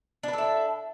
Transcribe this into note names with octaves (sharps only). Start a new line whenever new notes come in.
D4 E4 A4 B4